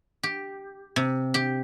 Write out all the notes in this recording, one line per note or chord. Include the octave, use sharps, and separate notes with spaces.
G4
C3
G4